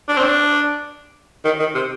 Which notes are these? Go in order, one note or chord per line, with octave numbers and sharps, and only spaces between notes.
D4
C4
D4
D#3
D#3
C3